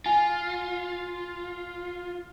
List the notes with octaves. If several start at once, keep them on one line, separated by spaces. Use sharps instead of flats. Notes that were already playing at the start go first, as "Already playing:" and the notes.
F4 G#5